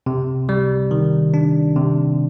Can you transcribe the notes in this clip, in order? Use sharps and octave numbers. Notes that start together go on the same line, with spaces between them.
C3
G3
D#3
D4
C3